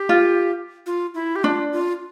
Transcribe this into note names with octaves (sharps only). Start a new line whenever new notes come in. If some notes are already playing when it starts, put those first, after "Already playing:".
Already playing: G4
F4
F4
E4
G4
D4 F4
F4